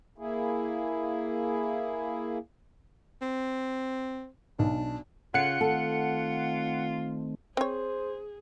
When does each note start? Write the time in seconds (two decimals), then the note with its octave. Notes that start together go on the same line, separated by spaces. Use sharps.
0.18 A#3 E4 G#4
3.22 C4
4.59 B1 D4
5.34 C#3 F4 A4 F#5 F#6 C#7
5.61 D#3 A3 C4 A4
7.57 C4 G#4 C5 C#5